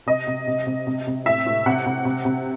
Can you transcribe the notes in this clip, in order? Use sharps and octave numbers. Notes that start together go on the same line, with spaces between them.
C3 D#5
C3
C3
C3
C3
C3
A2 E5
A2
C3 F#5
C3
C3
C3